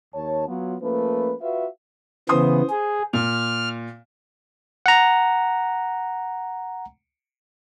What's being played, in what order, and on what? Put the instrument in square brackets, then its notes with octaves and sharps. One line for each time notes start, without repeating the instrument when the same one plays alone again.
[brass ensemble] D#2 C#5 A5
F#3 B3 F4
F3 A3 A#3 C#4 B4
F4 F#4 B4 E5 F5
[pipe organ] C#3 E3 B3 [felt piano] C5 C6 D#6
[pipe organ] G#4
[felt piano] A#2 [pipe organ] F6
[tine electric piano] F#5 A#5